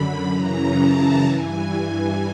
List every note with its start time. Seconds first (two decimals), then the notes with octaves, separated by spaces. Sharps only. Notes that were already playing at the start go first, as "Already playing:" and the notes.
Already playing: F#2 D3 B5
0.30 F#2 C#3 E3 A#5
0.76 A5
1.23 G2 E3 G#5
1.70 G#5